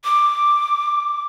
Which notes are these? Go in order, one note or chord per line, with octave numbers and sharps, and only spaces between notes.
D6